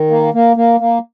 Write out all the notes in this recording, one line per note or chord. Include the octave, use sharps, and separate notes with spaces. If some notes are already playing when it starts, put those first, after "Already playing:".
Already playing: D#3
A#3
A#3
A#3
A#3